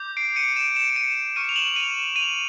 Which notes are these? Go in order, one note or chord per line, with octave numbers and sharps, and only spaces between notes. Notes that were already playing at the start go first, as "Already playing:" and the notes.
Already playing: D6 G6
C7 D7
C#7 D#7
D7 E7
D7 E7
E7
C#7 D#7
C#6 F6 C#7 D#7
F7
E7 F#7
D#7 F7
D#7 F7